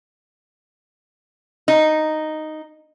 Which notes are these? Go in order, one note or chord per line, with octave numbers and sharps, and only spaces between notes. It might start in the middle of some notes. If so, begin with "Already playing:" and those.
D#4